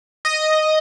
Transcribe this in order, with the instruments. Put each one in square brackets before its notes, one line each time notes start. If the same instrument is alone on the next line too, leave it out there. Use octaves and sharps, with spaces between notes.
[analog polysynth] D#5